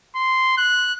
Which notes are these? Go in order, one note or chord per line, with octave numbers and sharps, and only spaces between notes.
C6
F#6